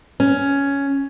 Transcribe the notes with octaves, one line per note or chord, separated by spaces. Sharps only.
C#4